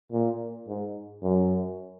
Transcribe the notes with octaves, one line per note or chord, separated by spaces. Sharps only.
A#2
G#2
F#2